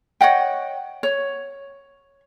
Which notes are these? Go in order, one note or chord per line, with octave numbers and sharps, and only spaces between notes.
C#5 D#5 F#5 G5
C#5